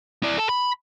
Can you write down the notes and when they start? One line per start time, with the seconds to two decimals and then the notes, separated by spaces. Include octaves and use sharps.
0.23 E4 D5
0.38 A4 A5
0.49 B5